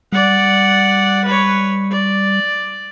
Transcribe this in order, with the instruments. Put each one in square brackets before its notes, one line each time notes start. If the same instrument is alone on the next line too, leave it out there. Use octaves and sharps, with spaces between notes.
[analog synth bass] G3 [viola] D5 F#5
[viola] B4 C#5
D5